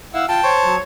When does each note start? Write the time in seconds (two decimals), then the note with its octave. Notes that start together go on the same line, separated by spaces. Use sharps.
0.14 E4 F5 F#5 E6
0.28 F4 G5 A5
0.44 C5 C#5
0.63 F#3